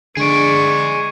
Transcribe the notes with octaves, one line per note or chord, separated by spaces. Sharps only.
D3 G#3 G#4 D5 C#6